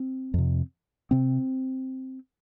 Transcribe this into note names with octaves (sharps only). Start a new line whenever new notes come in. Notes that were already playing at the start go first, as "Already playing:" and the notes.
Already playing: C4
F2 C3
C3 C4